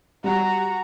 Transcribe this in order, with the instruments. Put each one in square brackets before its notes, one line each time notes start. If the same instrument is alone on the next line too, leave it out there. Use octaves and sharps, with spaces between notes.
[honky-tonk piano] G3 [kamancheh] F#4 A#5